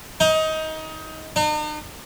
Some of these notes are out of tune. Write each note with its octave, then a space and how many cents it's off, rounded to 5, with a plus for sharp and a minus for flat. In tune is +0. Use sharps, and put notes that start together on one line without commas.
D#4 +20
D#4 -45